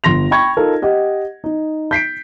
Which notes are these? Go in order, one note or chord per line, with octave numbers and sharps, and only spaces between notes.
G1 C6 A#6 F7
G5 B5 C#6 G#6
D#4 F4 A4 A#4
G4 D#5 F#5
D#4
G6 B6 C7 D7